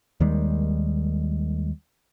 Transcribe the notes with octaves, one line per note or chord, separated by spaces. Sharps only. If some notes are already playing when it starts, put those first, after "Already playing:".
D#2 D#3 G3 G#3